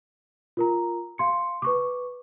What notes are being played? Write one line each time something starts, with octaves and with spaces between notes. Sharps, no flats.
F4 A#4 A#5
F5 C6 C#7
B4 C#6 D6